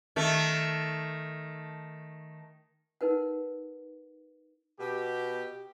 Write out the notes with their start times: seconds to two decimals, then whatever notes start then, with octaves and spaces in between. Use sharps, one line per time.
0.16 D#3 A3
3.01 D#4 A#4 B4 F#5
4.79 B2 G4